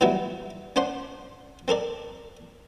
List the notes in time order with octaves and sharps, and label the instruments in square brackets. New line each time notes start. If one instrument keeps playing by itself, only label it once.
[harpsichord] E3 F#3 G3 B3 D#4 E4
C#4 D4 C5 F#5 C6
C4 A4 A#4 D5